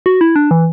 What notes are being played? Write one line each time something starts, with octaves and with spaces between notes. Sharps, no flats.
F#4
E4
D4
E3